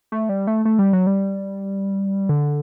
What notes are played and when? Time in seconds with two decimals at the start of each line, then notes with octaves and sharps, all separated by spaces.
0.12 A3
0.29 G3
0.47 A3
0.65 A3
0.79 G3
0.93 F#3
1.07 G3
2.29 D3